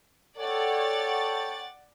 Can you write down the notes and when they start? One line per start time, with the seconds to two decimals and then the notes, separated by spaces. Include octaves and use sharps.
0.38 A4 C#5 D5 F#5 G5 A6